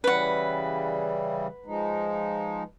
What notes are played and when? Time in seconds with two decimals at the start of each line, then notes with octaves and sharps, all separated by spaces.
0.04 C#3 E3 G3 B4 F#5
1.66 F3 G#3 D#4